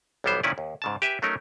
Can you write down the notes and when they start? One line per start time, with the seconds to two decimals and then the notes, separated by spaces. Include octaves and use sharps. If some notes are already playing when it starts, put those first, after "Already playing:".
0.24 B1 E3 G3 B3 C5
0.43 A#2 D#3 C#4 E4 B4 D5
0.58 D#2
0.82 G#2 C#3 A5
1.02 G4 B4 E5 G#5
1.22 F#3 A3 C#4 D#4 A#4